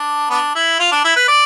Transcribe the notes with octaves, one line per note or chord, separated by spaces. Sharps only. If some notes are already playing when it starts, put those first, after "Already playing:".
Already playing: D4
B3 D4
E4
F4
D4
E4
B4
D5